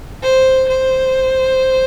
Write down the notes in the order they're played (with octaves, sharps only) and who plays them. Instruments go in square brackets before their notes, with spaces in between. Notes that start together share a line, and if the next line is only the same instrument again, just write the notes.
[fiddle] C5
C5